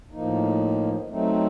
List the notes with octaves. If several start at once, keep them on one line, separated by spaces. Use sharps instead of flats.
A2 F3 A#3 D#4
F#3 A3 C4 D#4